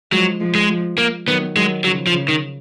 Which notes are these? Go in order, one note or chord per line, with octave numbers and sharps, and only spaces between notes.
F3 F#3 G#3
F3 G#3
G#3
F3 G#3
A#3
D#3 F#3 B3
D#3 F#3 G#3
C#3 F3 F#3
F3
C#3
D#3